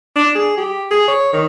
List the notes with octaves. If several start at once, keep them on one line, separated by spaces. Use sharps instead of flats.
D4
G#4
G4
G#4
C#5
D#3